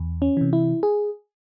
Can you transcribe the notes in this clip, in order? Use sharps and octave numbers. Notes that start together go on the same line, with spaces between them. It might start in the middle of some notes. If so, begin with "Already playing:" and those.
Already playing: E2
C#4
C3 E3
E4
G#4